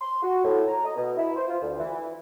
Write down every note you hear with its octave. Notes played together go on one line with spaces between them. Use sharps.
C6
F#4
A2
A#5
D#5
B2
E4
C5
F4
D2
E3